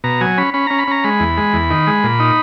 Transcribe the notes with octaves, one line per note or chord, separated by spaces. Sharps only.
B2 A#5
F#3 G#5
C#4 B5
C#4 B5
C#4 A#5
B5
C#4 A#5
G#3 B5
E2
G#3
E2
D#3
G#3
A#2
D#4